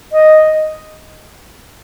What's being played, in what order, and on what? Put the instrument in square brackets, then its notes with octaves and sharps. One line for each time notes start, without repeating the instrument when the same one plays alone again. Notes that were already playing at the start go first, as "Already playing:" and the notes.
[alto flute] D#5